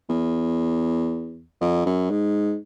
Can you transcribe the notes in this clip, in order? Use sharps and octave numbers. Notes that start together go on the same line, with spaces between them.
E2
F2
F#2
G#2